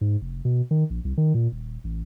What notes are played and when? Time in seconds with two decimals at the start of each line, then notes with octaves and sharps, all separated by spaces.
0.01 G#2
0.21 F1
0.45 B2
0.71 D#3
0.90 A#1
1.05 C2
1.17 D#3
1.34 A#2
1.52 D#1
1.84 A1